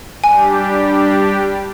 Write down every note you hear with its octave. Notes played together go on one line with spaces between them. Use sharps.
G3 D4 G4 G#5